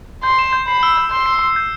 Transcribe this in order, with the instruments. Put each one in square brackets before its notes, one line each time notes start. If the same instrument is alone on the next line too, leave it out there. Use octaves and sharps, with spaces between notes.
[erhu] C6 [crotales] G6
[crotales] E7
G6
[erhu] B5 [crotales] C7
[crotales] E6
G6
[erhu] C6 [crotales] G6
[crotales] C7
C7
G6